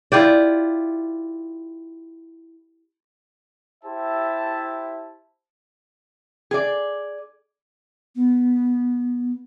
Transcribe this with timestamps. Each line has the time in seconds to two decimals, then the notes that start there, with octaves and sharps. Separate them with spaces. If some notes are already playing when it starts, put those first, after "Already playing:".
0.12 E4 F4 G4 D5
3.84 E4 G4 C5 E5 A5
6.51 G#4 D5
8.15 B3